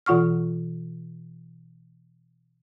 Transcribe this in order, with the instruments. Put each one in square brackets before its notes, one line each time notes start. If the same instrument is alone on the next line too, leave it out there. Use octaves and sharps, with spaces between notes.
[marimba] B2 E3 F4 F#5 C#6 F6